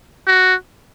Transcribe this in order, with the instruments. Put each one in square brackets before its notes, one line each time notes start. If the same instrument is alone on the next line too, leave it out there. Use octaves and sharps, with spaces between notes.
[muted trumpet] F#4